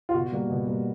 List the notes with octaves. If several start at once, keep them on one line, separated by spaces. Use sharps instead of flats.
F4
B2 F#4
G3 A#3
B2
G3 A#3